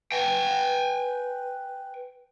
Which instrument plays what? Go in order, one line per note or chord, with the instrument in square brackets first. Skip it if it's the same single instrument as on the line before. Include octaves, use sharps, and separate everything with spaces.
[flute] B4 [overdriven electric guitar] G5 G#5